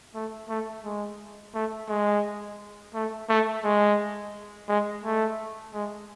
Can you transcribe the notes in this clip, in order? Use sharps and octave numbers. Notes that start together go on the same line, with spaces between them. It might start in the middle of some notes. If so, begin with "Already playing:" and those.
A3
A3
G#3
A3
G#3
A3
A3
G#3
G#3
A3
G#3